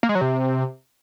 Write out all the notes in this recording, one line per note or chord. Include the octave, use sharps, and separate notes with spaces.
A#3
G#3
F#3
C3